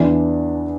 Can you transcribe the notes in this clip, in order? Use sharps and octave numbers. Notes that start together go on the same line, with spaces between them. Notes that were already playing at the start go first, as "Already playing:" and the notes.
Already playing: E2 E3 D4